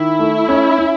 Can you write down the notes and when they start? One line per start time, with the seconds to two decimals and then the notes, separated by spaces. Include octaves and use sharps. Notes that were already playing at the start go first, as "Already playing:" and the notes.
Already playing: D#3 E4
0.19 A3
0.49 C#4
0.78 C#4